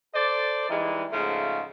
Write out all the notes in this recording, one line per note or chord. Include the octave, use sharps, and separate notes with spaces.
A4 C5 D5
E3 G3 G#3 D#4
G#2 C#3 F3 A3